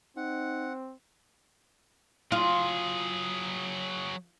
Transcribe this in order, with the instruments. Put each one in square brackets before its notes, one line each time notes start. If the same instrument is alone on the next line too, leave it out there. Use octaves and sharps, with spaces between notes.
[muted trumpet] C4 [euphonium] D#4 [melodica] F#5
[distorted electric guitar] F#3 G#4 [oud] F4